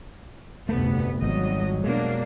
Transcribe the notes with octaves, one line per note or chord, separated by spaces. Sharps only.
F1 D2 G2 A3 B3
G#1 F2 F#3 G3 D#5
B2 G#3 A#3 D4